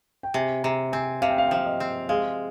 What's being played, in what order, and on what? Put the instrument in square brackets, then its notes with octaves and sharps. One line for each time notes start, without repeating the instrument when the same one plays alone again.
[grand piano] G5
[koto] C3 [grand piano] G#5
[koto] C3 [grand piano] A#5
[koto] C4 [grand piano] G#5
[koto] C3 [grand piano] F5
[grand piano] G5
F5
G5
[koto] F3 [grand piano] F5
[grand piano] D#5
[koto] C4
[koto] G#3 [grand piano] F5